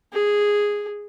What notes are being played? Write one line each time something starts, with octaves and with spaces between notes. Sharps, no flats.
G#4